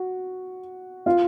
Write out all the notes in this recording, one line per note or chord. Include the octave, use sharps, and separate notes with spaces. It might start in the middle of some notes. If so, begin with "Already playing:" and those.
Already playing: F#4
F4 F5